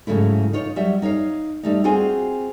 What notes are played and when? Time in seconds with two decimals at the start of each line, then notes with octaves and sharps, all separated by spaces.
0.07 G#2 C#3 F#3 A3 E4
0.53 D#4 F4 C#5
0.76 F#3 G3 E5
1.02 D#4 C#5 D5 F5
1.63 G3 A3 D#4
1.84 C4 F4 F#4 G#4 C5 G#5